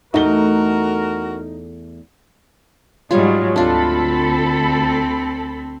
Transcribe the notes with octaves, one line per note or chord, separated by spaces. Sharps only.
E2 A3 D#4 F#4 A#4 G7
G#2 F#3 G3 F4 C#5
D2 C4 D4 F4 A4 B5